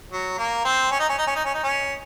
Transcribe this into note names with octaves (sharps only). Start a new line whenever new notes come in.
F#3
A#3
C4
C#4
D#4
C#4
D#4
C#4
D#4
C#4
D#4
C#4